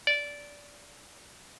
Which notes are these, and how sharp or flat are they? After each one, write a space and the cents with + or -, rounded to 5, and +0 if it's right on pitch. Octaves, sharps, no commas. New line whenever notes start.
D5 -15